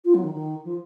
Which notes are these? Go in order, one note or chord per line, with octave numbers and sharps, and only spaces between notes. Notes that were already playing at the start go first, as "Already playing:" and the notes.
F4
F#3
D#3
D#3
F3